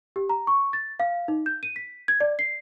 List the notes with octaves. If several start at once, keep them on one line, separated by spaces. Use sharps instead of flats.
G4
A#5
C#6
A6
F5
D#4
G6
D#7
B6
G#6
D5
C7